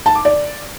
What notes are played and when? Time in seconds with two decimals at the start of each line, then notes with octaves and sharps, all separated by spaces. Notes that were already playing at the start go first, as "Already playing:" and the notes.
0.06 A5
0.15 D6
0.25 D5